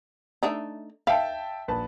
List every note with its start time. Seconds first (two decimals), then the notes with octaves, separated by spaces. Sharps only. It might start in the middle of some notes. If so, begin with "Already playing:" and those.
0.43 A3 D4 D#4
1.07 E5 F5 G5 A5 B5
1.68 A#1 B4 A5